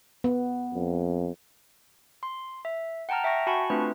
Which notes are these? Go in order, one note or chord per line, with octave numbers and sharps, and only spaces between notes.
B3
F2
C6
E5
F#5 G5 A5 A#5 F6
E5 G5 C#6 A#6
F#4 F#5 G#5 A5 B5 C#6
A3 C4 D4 F4 B4